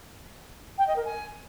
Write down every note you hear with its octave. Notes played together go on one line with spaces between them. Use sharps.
G5
D#5
A#4
G#5